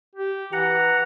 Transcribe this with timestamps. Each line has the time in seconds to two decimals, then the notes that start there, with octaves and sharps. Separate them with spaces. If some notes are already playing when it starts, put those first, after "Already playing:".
0.15 G4
0.53 E3 F#5 A#5